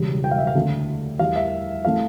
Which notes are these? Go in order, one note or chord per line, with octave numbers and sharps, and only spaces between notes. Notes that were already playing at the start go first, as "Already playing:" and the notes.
Already playing: E1 E2 C#3 G3
G5
F5
E5
F5
D2 D3 A3
E2 E3 G3 F5
E5
E3 A3 F5